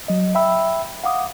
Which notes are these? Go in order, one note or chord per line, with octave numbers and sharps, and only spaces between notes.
F#3 D#5
E5 G5 B5 E6
F5 F#5 D6 D#6